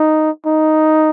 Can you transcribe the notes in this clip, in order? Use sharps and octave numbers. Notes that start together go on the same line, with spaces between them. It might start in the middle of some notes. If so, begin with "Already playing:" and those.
Already playing: D#4
D#4